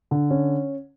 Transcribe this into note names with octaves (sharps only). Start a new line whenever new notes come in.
D3
C#4